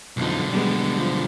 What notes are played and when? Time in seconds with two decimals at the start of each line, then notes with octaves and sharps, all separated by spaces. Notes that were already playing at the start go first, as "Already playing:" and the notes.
0.17 B1 F2 D3 D#4
0.50 G3 G#3 B3
0.97 F3